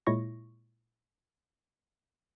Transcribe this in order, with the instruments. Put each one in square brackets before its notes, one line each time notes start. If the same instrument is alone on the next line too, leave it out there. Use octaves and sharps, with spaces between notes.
[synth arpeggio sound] A#2 G#3 E4 C#5 C#6 A#6